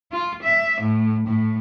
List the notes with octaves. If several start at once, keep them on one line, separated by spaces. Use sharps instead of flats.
F4
E5
A2
A2